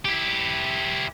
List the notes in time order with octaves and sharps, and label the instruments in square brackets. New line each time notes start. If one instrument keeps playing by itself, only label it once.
[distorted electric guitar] E4 G4